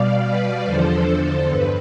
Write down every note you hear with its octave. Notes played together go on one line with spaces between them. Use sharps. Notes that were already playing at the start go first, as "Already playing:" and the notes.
Already playing: B2 G3 D5 F5
B4 D5
E2 D3 F3 A4 C5
G2 B4